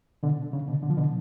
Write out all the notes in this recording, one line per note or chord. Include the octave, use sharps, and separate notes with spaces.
B2 D3
C#3
B2 D3
D3
F3
B2 D3